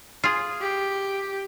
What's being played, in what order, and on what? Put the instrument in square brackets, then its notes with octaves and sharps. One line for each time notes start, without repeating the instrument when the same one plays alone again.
[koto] F4 G#4
[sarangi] G4